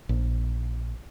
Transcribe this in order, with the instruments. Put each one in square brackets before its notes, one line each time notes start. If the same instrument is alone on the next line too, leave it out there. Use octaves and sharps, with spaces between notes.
[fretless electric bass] A#1